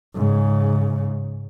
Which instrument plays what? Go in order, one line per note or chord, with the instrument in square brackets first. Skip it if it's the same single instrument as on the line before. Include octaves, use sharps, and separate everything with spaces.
[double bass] G#2 C#3